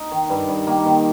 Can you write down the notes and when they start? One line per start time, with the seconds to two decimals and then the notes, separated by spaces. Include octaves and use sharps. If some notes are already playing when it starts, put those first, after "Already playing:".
Already playing: D#4
0.12 D#3
0.30 G2
0.49 G2
0.67 D#3 A#3
0.86 D#3